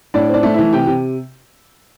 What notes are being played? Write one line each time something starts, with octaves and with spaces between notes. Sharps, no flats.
A2 D4 D5
C4 D4 D5
A3
E3 E4 E5
C3 G4 G5
C3